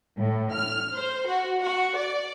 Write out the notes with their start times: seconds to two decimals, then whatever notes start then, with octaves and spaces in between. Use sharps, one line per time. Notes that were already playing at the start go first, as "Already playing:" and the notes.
0.18 A2
0.54 F6
0.94 C5
1.27 F#4
1.61 F#4
1.97 D5